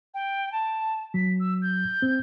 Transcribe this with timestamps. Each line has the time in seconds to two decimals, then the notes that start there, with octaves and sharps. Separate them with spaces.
0.14 G5
0.52 A5
1.14 F#3 B6
1.40 E6
1.62 G6
2.02 C4